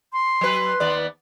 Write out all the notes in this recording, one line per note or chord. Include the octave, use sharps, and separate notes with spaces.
C6
F#3 B4
D#2 B3 D5